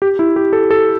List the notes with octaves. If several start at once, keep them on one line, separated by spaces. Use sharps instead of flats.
G4
E4
G4
A4
A4